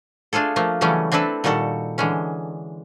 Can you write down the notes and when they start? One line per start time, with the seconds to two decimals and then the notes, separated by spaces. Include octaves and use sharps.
0.33 A3 D4 F4 G#4 A4
0.56 F3 A3 A#3
0.81 C#3 E3 F#3 G3 A3 C#4
1.12 C4 D4 E4 A4 B4
1.44 A#2 D#3 G3 F#4 A4
1.98 D3 E3 G#3 C#4